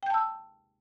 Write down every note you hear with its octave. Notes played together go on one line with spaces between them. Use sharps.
G5 A5 E6 G6